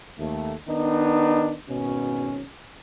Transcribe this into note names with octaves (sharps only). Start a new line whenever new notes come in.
D#2 A3
D#3 B3 D4 D#4
G#1 B2 C#4